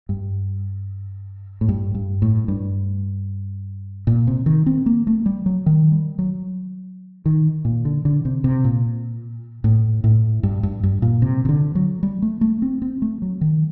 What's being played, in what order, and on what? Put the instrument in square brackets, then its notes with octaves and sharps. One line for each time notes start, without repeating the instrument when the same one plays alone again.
[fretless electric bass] G2
A2
G2
G2
A2
G2
A#2
C3
D#3
C4
A#3
A3
G3
F#3
D#3
G3
F#3
D#3
A#2
D3
D3
C3
C3
A#2
A2
A2
G2
G2
G2
A#2
C3
C3
D3
F#3
G3
A3
A3
C4
C4
A3
F#3
D#3